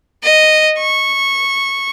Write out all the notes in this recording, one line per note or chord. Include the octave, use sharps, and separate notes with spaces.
D#5
C#6